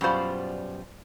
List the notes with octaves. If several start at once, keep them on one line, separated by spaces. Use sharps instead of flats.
F#2 B2 G3 F4 C5 D5